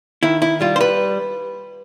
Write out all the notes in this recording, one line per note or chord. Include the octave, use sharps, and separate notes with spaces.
D#3 E4
E4
G3 F4
C5
B4